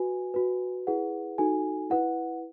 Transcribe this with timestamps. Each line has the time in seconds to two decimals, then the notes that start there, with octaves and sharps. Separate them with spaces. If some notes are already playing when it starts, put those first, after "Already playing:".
Already playing: F#4 B4 G#5
0.34 F#4 B4
0.87 E4 G#4 B4 F#5
1.38 D#4 F#4 A4 G#5
1.90 E4 B4 F#5